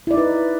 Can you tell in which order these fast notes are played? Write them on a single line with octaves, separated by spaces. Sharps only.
E4 D5 D#4 B4